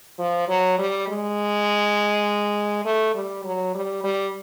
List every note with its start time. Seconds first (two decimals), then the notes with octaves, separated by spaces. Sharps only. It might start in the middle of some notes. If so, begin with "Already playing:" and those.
0.19 F3
0.49 F#3
0.78 G3
1.08 G#3
2.85 A3
3.15 G3
3.45 F#3
3.75 G3
4.04 G3